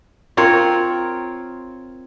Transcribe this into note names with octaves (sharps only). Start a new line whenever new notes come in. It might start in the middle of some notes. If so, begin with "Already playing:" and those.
C4 F4 A#4 C#5